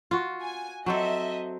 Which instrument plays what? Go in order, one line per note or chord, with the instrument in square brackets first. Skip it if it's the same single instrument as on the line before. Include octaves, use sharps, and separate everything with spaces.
[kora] F4 F#4
[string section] G#5
[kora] F#3 C4 A4 [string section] D#5 E5